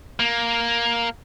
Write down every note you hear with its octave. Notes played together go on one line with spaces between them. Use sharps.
A#3